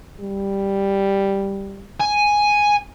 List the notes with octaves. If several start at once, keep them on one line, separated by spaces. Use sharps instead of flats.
G3
G#5